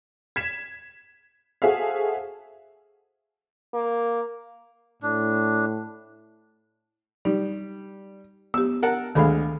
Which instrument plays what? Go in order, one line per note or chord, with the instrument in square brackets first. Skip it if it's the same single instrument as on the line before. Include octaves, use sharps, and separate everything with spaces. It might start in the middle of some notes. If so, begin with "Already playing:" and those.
[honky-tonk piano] G#6 B6 E7
F#4 G#4 A4 C5 E5 F5
[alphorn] A#3
[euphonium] A2 [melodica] D4
[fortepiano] G3 [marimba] D#4
[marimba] B3 G4 [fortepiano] E6
[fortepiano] A#4 F#5 A5
[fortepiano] D2 G#3 F5 [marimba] D#3 A4 B5